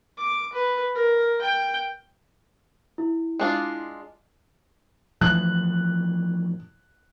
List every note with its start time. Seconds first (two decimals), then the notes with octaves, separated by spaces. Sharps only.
0.18 D6
0.53 B4
0.95 A#4
1.42 G5
2.98 E4
3.40 G#3 D4 F4
5.21 A2 E3 F3 F#6